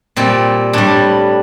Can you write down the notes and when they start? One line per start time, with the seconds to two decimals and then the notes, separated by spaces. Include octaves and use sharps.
0.16 A#2 G3 C4
0.73 A2 G3 D4